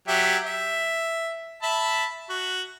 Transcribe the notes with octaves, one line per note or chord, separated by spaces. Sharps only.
F#3 G4 E5
E5
E5 A5 B5
F#4